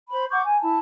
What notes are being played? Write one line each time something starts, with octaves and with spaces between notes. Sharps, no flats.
C5 B5
F#5 C#6 D6 G6
G#5
E4 A5